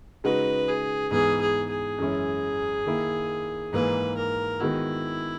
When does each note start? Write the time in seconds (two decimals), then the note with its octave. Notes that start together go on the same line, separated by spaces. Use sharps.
0.24 C#3 G#3 D#4 F#4 B4
0.68 G#4
1.11 G#2 E3 B3 G#4
1.41 G#4
1.70 G#4
1.98 F#2 E3 G#3 C#4 E4
2.86 D#3 A#3 E4
3.73 G#2 E3 A#3 B4
4.18 A#4
4.60 D#3 G#3 B3 E4 F#4